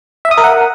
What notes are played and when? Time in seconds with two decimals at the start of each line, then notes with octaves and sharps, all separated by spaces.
0.25 E5
0.31 D#6
0.38 A#4
0.44 F#5